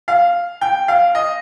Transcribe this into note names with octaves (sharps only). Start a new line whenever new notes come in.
F5
G5
F5
D#5